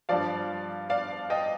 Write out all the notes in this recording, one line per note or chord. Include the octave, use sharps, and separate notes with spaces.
G2 F3 D5 F5
D5 F5
D#5 G5